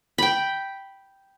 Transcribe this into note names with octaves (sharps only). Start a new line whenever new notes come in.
G5 B5